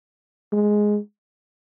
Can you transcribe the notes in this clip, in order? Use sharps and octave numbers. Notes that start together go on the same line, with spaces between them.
G#3